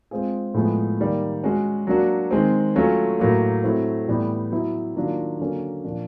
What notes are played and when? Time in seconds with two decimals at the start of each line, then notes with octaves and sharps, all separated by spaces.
0.11 G#3 C4 F4 G#4
0.54 A2 F3 G#3 B3
1.00 D#3 G3 A#3
1.43 G#3 C#4 F#4
1.87 F#3 A#3 D4 F#4
2.31 D#3 G#3 C4
2.75 F#3 A3 C#4 F4
3.20 A2 F#3 A#3
3.64 F#3 A3 C4 E4
4.08 A2 E3 G3 B3
4.52 F#3 B3 E4
4.95 D#3 F#3 A#3 D4 F4
5.40 D3 F#3 A#3 C#4
5.84 A#2 F3 A#3 D4